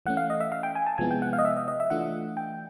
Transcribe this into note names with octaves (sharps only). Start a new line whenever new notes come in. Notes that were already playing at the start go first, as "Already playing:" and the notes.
E3 A3 C#4 F#5
F5
D#5
E5
F5
G5
G#5
A5
C3 F3 G#3 B3 E4 G#5
G5
F#5
F5
D#5
E5
D#5
D#5
E5
E3 A3 D4 F4 F#5
G5